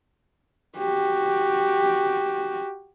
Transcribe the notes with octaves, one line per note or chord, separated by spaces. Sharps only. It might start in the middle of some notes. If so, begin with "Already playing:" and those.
F#4 G4